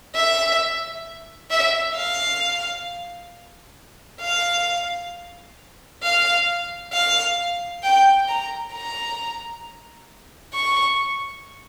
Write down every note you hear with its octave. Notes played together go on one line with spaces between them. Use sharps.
E5
E5
F5
F5
F5
F5
G5
A#5
A#5
C#6